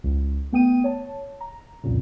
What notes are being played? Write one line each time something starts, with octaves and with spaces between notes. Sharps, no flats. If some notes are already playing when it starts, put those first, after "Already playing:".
C#2
A3 B3 G5 D#6 D#7
C#5 A5
A#5
C2 F2 A#2 C#3